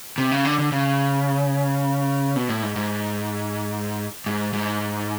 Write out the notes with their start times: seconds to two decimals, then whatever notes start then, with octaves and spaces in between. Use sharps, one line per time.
0.18 C3
0.31 C#3
0.45 D3
0.58 D3
0.72 C#3
2.36 B2
2.49 A2
2.62 G#2
2.76 G#2
4.26 G#2
4.53 G#2